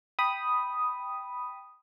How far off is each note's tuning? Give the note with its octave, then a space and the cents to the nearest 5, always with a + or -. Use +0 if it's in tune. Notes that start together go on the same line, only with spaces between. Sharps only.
G5 +0 B5 +0 D#6 +0